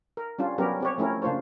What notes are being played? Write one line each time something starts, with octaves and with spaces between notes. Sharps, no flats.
A#4
G3 C#4 D4 F4
F#3 G3 B3 C#4 G4 A#4
C4 G4 C#5
F3 A3 C#4 E4 A#4
C#3 A#3 D4 F4 C5 C#5